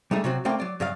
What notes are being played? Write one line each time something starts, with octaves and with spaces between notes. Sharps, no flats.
G3 A3 D#4 G#4
C3 F#3 C4 F#4
A3 A#3 C4 D5 G5
F#3 D5
G2 F#3 D5 F5